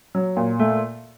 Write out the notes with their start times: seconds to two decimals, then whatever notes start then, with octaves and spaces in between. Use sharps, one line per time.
0.15 F#3
0.37 A#2
0.59 A3